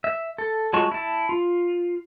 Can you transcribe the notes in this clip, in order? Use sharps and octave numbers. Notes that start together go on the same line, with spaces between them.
E5
A4
F#3 G#3 F4 A5 C#6
E4 A5
F4